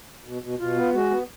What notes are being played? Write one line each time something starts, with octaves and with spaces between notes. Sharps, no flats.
B2
B2
B2 F4
B3
G#3 F#4
B3